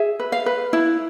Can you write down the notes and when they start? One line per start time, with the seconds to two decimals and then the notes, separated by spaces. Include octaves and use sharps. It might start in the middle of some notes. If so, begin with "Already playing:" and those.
Already playing: G#4 E5
0.20 B4
0.32 F5
0.46 B4
0.73 E4